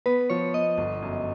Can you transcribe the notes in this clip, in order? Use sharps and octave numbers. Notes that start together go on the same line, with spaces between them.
B3 B4
F3 C#5
B3 D#5
G1
F#2